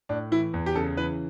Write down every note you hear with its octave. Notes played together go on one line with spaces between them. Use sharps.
A2 D4
E3 E4
E2
G4
C#3 A4
E3 B4